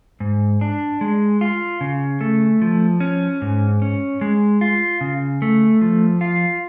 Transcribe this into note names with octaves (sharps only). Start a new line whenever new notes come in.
G#2
D4
G#3
F4
C#3
A3
F3
C#4
G#2
C#4
G#3
F4
C#3
A3
F3
F4